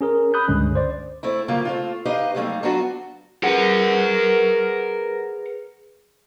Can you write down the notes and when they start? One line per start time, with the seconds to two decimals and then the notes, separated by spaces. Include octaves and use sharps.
0.01 C#4 G#4 A#4
0.34 B5 D#6 F#6 G6
0.48 C#2 G2 D3 G#3 C#4
0.75 C5 D5
1.23 A3 C4 E4
1.48 F#2 C#3 G3 A#3 F4
1.65 A3 C4 F4
2.05 D#4 G4 B4 D#5 F5
2.35 F#3 G3 A3 A#3 C4 D#4
2.63 F#3 B3 D4 F4 F#4
3.43 G#4 A#4 B4 F#5